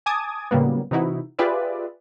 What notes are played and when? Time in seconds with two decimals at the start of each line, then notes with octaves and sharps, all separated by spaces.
0.06 G#5 A5 D6 D#6 G#6
0.51 A2 C#3 F#3 G3 A#3 B3
0.91 C3 E3 D#4 E4 F#4
1.39 F4 G4 G#4 B4 D5 E5